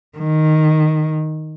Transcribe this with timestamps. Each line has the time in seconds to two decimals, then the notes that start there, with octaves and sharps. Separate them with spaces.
0.18 D#3